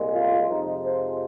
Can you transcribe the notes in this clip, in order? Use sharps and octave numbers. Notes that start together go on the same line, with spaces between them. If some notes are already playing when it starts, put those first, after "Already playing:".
Already playing: C2 A#2 G#3
F4
F2 C3 F3 G#3 D#4
C5